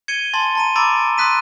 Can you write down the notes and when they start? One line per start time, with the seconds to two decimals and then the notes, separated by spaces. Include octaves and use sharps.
0.08 G#6 C#7 D#7 G7
0.33 G#5 A5 C6 A6
0.55 A5 A#5 D#7
0.76 A#5 B5 D6 E6 A6 D7
1.18 C6 D#6 F#6 B6 D#7